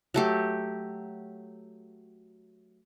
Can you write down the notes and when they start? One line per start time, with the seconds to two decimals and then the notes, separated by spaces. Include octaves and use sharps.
0.14 F#3 A3 G4